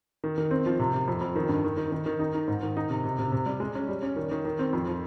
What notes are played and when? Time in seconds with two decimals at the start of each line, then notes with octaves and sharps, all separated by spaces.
0.24 D#3
0.38 D#3
0.51 C4
0.66 F3
0.79 C3
0.94 C3
1.08 F2
1.21 F2
1.36 D#3
1.49 G2
1.64 D#3
1.77 D#3
1.92 D#3
2.06 D#3
2.19 D#4
2.35 D#4
2.47 G#2
2.63 D#3
2.77 D#4
2.90 C3
3.04 C3
3.19 C3
3.32 C3
3.46 G3
3.60 G#3
3.75 C#4
3.89 G3
4.03 C#4
4.16 D#3
4.31 D#3
4.45 D#3
4.59 C4
4.73 F2
4.87 F3